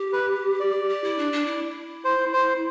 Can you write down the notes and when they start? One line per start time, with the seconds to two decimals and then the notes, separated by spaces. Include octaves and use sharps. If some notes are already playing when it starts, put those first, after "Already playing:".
Already playing: G4
0.13 B4
0.60 D5
0.90 G4
1.04 E4
1.19 D4
1.33 D4
1.46 E4
2.05 C5
2.33 C5